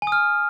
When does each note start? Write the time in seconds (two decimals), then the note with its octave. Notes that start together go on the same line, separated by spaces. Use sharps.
0.02 G#5
0.07 D#6
0.12 F6